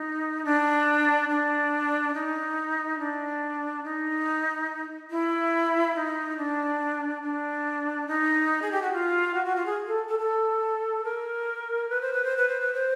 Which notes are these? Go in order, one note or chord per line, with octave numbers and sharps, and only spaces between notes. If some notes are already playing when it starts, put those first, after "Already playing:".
Already playing: D#4
D4
D4
D#4
D4
D#4
E4
D#4
D4
D4
D#4
G#4
G4
F#4
F4
F#4
F#4
F4
G#4
A4
A4
A4
A#4
B4
C5
B4
C5
B4
C5
B4
C5